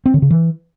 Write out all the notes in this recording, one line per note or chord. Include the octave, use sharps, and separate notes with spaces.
C4
D3
C#3
E3